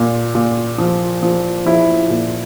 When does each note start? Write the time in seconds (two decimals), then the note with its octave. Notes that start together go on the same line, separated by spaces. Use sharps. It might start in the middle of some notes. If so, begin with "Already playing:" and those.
Already playing: A#2
0.35 A#2
0.78 F3
1.23 F3
1.66 F3 E4
2.10 A#2